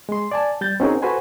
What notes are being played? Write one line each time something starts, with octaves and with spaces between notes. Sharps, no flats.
G#3 C6
D5 G#5 A5
G3 G6 A6
C4 C#4 D#4 F#4 G#4 A#4
F#4 A4 B4 C5 G#5